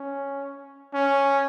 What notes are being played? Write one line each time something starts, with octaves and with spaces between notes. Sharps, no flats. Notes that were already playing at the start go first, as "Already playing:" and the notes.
Already playing: C#4
C#4